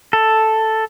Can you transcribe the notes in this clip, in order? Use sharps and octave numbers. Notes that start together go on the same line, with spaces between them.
A4